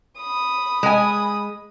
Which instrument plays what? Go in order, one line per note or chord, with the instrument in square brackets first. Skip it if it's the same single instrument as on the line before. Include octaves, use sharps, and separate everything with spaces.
[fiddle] B5 D#6
[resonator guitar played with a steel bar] G#3 G#5